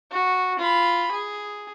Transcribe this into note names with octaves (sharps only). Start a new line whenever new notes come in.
F#4
F4 B5
G#4